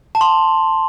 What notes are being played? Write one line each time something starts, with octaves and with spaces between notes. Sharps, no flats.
A5
C6